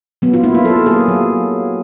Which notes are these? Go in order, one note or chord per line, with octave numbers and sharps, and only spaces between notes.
F#3 B3
F4
A#3 E4
F4
F#3 A4
A#3 G#4
F#3